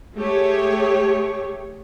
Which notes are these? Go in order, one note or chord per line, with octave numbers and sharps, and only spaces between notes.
A3 G4 G#4 C#5